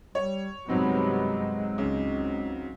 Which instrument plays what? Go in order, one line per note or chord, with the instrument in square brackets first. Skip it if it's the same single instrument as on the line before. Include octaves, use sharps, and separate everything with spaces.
[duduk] G3 [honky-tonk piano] C#5
[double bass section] G2 C3 B3 [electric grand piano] F#3 C4 D#4 [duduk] G#3
[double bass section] C#2 [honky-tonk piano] C#3